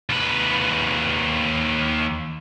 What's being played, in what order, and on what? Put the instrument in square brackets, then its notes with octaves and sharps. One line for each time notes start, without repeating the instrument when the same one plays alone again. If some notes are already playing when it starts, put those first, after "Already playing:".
[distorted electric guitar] D#2 B4